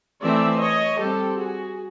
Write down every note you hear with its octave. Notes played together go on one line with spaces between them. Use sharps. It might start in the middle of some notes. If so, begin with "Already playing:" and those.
E3 A3 C4 D5 E5
C#5 D#5
G3 C4 G4 A4
F#4 G#4